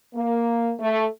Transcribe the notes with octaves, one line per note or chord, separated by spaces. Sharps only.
A#3
A3